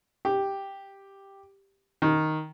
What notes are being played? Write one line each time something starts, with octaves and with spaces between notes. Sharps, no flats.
G4
D#3